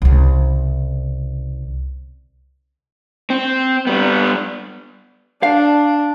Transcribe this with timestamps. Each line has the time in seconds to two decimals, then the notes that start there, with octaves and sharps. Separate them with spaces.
0.02 C2 C#3
3.30 C4
3.87 G3 B3
5.43 D4 F5